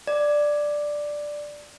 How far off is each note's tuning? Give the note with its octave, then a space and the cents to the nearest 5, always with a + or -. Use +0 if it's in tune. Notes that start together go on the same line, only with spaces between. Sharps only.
D5 +5